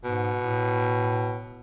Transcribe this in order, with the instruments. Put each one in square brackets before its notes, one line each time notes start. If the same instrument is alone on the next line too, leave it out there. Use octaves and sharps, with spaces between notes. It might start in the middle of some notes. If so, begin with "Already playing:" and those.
[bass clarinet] G#2 [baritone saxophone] B2
[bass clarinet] A2